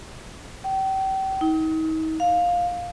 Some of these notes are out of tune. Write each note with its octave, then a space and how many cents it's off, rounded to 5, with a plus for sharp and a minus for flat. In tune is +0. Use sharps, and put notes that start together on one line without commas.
G5 -35
D#4 +35
F5 +10